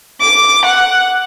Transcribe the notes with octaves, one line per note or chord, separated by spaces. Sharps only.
D6
F#5